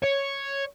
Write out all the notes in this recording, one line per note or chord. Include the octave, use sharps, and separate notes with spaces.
C#5